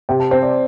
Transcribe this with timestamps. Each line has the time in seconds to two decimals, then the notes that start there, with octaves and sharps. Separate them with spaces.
0.09 C3 G5
0.20 A5
0.31 C4 C5
0.43 D5